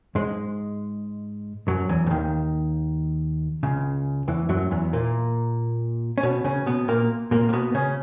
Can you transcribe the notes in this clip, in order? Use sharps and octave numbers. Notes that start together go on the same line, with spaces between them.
G#2 G#3
F#2 F#3
E2 E3
C#3
D#2 D#3
C#2 C#3
E2 E3
F#2 F#3
E2 E3
A#2 A#3
C#4
B2 B3
C#3 C#4
B2 B3
A#2 A#3
A#2 A#3
A#3
B2 B3
C#3 C#4